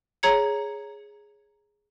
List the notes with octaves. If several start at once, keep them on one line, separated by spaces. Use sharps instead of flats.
G#4 C#5 A#5 G#6 C#7